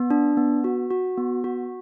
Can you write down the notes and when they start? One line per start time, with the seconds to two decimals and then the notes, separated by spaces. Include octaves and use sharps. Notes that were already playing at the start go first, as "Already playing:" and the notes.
Already playing: B3
0.10 D4
0.37 B3
0.64 F#4
0.91 F#4
1.18 B3
1.44 F#4